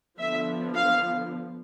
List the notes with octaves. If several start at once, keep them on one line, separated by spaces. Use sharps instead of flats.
D3 F3 B3 E5
F5